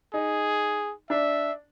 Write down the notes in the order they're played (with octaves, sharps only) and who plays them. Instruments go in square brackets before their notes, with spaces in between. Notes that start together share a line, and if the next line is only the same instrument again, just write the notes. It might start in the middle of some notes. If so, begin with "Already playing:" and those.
[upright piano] D#4 [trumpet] G#4
[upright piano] D4 [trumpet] E5